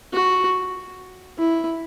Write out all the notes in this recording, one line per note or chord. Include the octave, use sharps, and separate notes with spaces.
F#4
E4